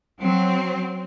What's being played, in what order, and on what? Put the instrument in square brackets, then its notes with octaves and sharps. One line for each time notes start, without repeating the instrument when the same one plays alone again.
[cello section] F#3 C4